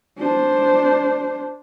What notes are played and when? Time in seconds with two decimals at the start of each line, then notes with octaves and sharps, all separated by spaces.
0.19 D4 C5